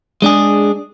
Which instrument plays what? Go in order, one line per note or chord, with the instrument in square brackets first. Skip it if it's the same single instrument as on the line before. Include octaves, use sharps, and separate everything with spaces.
[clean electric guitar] G#3 D4 G#4